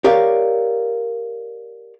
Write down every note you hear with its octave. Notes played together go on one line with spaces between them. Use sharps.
G4 A#4 C#5 D5 F5